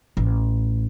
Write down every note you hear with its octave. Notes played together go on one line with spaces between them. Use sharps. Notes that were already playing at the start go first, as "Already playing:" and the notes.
A1